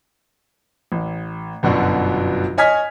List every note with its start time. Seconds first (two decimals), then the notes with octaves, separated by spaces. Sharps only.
0.92 A1
1.63 G1 F#2 B2 D3
2.58 C#5 D#5 G#5 F6 G#6 B6